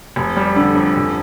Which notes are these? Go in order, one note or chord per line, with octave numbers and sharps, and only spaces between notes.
F1
G3
D3
F2
F1